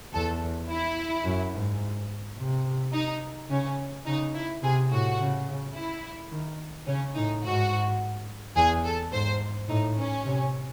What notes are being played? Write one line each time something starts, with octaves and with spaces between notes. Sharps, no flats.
E2 A4
E4
F#2
G#2
C3
D#4
C#3 C#4
C#3 D#4
E4
C3 G#4
A2 F#4
C#3
E4
D#3
C#3 C#4
A2 D#4
G#2 F#4
E2 G#4
A4
G#2 C5
A2 D#4
C#4
C3